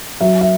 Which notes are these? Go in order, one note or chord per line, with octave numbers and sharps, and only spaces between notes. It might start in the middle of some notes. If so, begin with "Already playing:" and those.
F#3 E5
E5